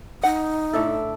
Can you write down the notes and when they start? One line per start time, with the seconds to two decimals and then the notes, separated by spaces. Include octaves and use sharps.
0.23 D#4 F#5
0.73 A2 D4 A4 E5